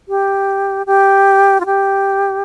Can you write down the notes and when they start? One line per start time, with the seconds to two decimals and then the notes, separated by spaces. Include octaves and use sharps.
0.09 G4
0.86 G4
1.60 F4
1.66 G4